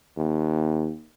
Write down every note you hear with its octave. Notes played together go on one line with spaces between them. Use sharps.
D#2